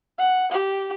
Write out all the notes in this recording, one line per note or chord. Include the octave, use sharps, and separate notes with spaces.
F#5
G4